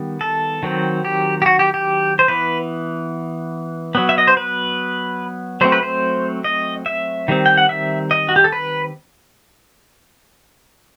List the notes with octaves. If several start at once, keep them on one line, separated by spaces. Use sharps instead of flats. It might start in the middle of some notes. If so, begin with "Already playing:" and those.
Already playing: D#3 G3 B3
A4
D#3 F#3 C4
G4
G4
F#4
G4
G4
C5
E3 B3 B4
F#3 B3
E5
D#5
C5
B4
F#3 A3 C4 C5
B4
C5
D#5
E5
D#3 G3 C4
G5
F#5
E5
D#5
F#4
G4
A4
B4